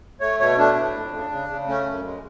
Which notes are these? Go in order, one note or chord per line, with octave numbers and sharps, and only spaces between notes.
A3 C#5
B2 C#5
A3 D4
A2
F2
C#3
C#3
C#3
A3 C#4
F#2
G#3